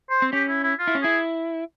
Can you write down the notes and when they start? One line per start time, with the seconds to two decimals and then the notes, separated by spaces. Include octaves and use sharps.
0.10 C5
0.22 C4
0.33 C#4 G4
0.49 E4
0.63 E4
0.79 F4
0.87 E4
0.95 C#4
1.02 E4 G#4